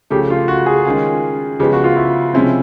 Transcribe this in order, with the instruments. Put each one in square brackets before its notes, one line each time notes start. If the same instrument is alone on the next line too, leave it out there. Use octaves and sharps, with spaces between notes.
[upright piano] C#3 F3 A3 [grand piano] G4
[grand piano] F4
F#4
G#4
[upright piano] D#3 G#3 C#4 F4
[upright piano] C#3 F3 G#3 B3 [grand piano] G4
[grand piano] F#4
F4
E4
[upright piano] C3 F3 G#3 C#4 E4 [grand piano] C4